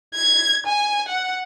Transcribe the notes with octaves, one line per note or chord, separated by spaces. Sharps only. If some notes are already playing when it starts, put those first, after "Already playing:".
G#6
G#5
F#5